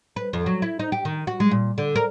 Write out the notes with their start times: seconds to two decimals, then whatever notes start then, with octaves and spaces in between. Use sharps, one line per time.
0.16 B4
0.33 F2
0.46 F#3
0.62 E4
0.79 D#4
0.92 G4
1.05 D#3
1.27 F#4
1.40 G#3
1.51 A#2
1.78 D3
1.95 A#4